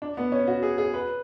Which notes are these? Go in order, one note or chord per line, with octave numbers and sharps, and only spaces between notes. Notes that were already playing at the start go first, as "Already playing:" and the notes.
D4
B3
C#4
F#4
G#4
G#4
B4